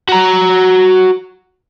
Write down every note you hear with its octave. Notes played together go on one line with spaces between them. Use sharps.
F#4 A#5